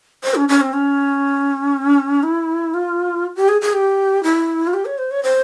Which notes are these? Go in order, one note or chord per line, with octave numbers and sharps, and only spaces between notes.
C5
C#4
C#4
C4
C#4
E4
F4
G4
G#4
G#4
G4
E4
F4
G4
C#5
C5
C#5
C5